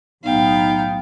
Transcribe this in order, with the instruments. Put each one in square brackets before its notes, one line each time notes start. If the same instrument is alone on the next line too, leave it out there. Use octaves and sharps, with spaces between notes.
[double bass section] B1 A2 [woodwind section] B3 [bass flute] D#4 [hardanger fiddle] F5 G5